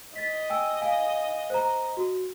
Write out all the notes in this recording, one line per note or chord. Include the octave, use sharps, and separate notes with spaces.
D#5 A6 B6
G5 G#5 E6
F5 G#5
C5 A#5
F#4